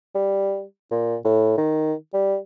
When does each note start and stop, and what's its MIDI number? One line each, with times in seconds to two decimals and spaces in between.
0.15 0.62 55
0.91 1.16 46
1.25 1.53 45
1.58 1.94 51
2.13 2.36 55